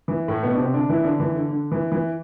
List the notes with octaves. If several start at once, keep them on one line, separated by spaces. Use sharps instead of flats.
E3
A2 A3
B2 B3
D4
C3 C4
D3 D4
E3 E4
D3 D4
E3
D3
D3
E3
E3